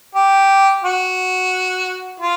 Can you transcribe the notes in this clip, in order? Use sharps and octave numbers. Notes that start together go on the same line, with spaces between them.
G4
F#4
F4